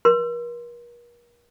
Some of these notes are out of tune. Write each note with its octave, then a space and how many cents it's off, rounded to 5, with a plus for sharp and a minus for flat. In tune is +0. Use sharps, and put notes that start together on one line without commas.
A#4 +40 C6 +0